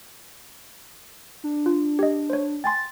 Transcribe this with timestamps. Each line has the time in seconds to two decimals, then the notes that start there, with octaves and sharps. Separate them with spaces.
1.44 D4
1.66 F4
1.99 G4 D#5
2.30 C5 C#5
2.64 G5 G#5 C6 A6